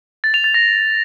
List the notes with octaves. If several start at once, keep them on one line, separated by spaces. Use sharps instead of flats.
A6
F7
A6
A#6